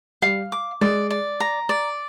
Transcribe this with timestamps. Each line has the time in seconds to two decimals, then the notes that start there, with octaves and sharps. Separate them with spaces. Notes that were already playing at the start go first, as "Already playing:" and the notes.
0.22 G3 F5
0.52 D6
0.81 G#3 D5
1.10 D5
1.40 A#5
1.69 D5